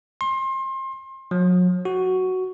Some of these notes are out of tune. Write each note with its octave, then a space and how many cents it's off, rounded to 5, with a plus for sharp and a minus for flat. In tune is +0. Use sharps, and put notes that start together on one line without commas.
C6 +30
F#3 -40
F#4 +5